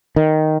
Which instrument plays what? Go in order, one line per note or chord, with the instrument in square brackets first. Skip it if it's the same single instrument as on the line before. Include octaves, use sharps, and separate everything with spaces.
[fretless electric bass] D#3